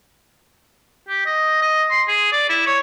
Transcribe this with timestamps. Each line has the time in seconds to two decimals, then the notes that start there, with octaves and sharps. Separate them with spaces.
1.08 G4
1.26 D#5
1.62 D#5
1.91 C6
2.08 G#4
2.33 D5
2.49 E4
2.66 C#5